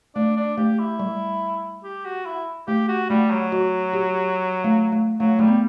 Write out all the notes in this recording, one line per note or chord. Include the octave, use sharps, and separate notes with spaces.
A3 D4
D4
A3 G4
E4
G3
G4
F#4
E4
A3 G4
F#4
G3 A3
F#3
F#4
G4
A3
A3
F#3 A3
G3 A3
B3